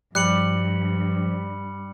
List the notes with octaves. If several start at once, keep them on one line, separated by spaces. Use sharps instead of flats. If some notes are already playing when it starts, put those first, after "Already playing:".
G2 F3 G3 F#6 C#7 F#7